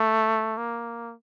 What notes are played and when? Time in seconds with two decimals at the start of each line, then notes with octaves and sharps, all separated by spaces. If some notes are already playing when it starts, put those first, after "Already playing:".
Already playing: A3
0.57 A#3